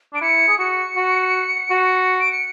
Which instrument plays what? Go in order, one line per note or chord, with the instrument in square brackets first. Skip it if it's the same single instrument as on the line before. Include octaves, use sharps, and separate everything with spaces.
[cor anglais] D4 [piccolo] D7
[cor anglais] E4 [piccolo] C#7
[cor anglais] G#4
[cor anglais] F#4 [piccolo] C#7
[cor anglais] F#4
F#4
[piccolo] D7
C#7